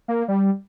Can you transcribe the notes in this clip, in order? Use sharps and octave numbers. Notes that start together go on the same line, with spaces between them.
A#3
G3